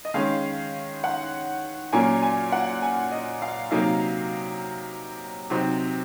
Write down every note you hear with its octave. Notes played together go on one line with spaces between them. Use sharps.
D#5
D#3 G#3 C#4 F5
F#5
A#2 F#3 A#3 C#4 G#5
G#5
F#5
G#5
D#5
F5
C3 F#3 A#3 D#4 F5
C3 F#3 C4 D#4